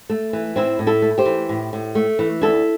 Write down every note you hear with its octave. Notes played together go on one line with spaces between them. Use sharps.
A3
E3
A2 C4 E4
A2
E4 A4
A3
G4 C5
E3
A2
A2
A3
E3
D2 E4 A4